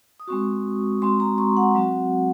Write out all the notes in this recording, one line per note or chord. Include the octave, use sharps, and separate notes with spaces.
D#6
G#3 C4 F#4 C#6
G#3 C4 F#4 C6
A#5
C#6
F#5
F#3 C4 F#4